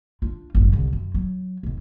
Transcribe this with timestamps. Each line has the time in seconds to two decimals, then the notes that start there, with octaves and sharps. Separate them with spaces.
0.22 D4 F4
0.55 G#1 F#2
0.72 C2 D3
0.93 F#2
1.14 F#3
1.63 E1 G#2